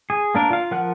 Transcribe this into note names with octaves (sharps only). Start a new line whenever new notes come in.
G#4
A#3 D4 A#4
F4 F5
F3 A#4 F#5 F#6